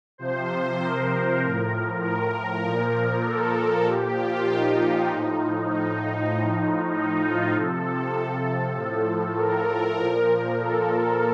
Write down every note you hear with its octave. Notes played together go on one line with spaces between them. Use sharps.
C3 F3 C5
A#4
A2 F3
A#4
A#2 F3
A4
A4
A#2 F3 G4
F4
D#4
A2 F3
D#4
A2 F3
D#4
F4
C3 F3 A4
A2 F3
A#4
A#2 F3
A4
A4